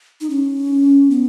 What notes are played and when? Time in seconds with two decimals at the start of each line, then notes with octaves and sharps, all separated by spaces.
0.21 D#4
0.30 C#4
1.11 B3